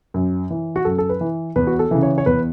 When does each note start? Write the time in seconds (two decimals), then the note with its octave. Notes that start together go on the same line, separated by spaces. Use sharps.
0.14 F#2
0.50 E3
0.76 F#4
0.85 F#2 A4
0.98 A4
1.09 B4
1.21 E3
1.56 E2 B4
1.67 F#4
1.79 A4
1.91 C#3 E3
2.02 C#5
2.18 C#5
2.26 E2 B4